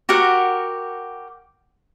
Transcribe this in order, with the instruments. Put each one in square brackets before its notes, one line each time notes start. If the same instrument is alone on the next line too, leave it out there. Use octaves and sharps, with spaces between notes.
[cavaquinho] F#4 G4 A#4 F#5